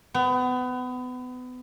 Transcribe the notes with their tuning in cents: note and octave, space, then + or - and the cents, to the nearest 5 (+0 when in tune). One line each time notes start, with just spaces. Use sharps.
B3 +30